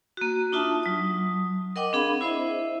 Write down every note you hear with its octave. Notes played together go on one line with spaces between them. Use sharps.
A#3 F#4
D4 D#4 F4 E5 A5
F#3 D#6
A#4 D#5 F#5 G5 D6
C4 D4 G#4 F5 B5
E4 C5 D#5 E5